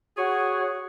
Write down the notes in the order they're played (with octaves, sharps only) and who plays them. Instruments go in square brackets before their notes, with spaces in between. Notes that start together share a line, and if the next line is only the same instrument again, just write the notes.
[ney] F#4 [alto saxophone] G#4 [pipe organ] C#5